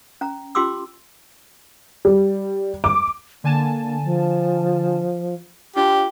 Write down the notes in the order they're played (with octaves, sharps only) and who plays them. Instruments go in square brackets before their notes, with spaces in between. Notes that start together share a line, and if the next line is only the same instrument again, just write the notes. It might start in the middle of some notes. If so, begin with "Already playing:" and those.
[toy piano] C#4 A#5
C#4 F4 G4 C6 D6 E6
[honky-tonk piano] G3
D6
[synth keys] D3 G#5 A5 [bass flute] A#3
[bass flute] F3
[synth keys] D4 F4 [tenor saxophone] G4